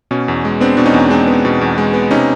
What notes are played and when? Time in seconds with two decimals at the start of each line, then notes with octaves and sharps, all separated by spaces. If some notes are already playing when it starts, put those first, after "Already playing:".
0.11 B2 C#4
0.28 E2
0.45 G#3
0.60 B3 C4 D4
0.77 B2 D4
0.85 C#4 D#4
0.94 E2
1.10 G#3 C4 D4
1.27 B3
1.45 B2
1.61 E2
1.78 G#3
1.94 B3
2.11 C3 C#4 D#4